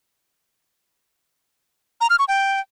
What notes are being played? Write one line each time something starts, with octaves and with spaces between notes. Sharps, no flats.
A#5
F6
C#6
G5